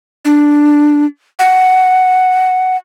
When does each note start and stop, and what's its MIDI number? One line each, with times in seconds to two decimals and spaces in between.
0.25 1.06 62
1.39 2.77 78